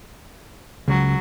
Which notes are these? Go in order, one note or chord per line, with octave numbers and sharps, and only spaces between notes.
C#2 F#3